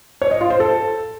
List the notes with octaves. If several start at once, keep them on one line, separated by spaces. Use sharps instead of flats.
C#5
D#5
F4
C5
A4